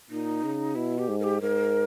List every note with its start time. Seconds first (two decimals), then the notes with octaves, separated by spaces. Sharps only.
0.10 A#2 D#4
0.44 C#3
0.75 B2 E4
0.98 G4
1.09 G#2
1.20 A#4
1.23 G4
1.41 G#2 A#4